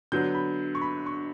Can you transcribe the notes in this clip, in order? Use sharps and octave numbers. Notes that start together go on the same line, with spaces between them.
D3 F#3 B3 G6
B5
C#6
B5
C#6